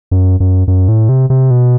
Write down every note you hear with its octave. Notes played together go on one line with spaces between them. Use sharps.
F#2
F#2
F#2
A2
C3
C3
B2